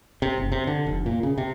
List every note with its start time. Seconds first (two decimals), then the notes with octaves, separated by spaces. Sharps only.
0.22 C3
0.38 F#1
0.52 C3
0.67 D3
0.87 F1
1.06 A#2
1.23 C#3
1.38 C3